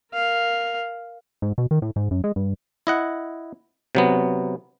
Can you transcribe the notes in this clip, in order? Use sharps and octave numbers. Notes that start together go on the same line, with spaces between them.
A#4 F5
G#2
B2
D#3
A2
G#2
F#2
G#3
G2
E4 D#5 F#5
C3 F#3 B3